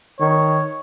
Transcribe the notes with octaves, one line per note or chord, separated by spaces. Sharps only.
D#3 C#5